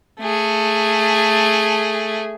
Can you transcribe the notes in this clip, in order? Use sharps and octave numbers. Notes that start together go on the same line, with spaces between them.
A3 G#4